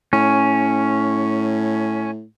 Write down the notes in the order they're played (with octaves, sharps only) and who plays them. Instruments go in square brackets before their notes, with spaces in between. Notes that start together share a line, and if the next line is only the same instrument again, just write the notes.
[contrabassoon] A2 [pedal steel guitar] C#4